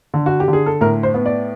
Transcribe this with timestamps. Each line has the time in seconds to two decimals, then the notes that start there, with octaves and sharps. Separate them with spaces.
0.14 D3
0.26 F#4
0.40 G4
0.48 D3
0.53 G#4
0.66 A4
0.81 A2 A#4
1.03 C5
1.14 B3
1.26 D5